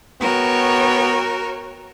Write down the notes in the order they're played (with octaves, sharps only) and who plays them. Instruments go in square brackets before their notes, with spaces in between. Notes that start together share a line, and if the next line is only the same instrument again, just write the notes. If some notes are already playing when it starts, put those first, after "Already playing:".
[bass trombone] B3 [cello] F#4 A#4 [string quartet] C#5 G5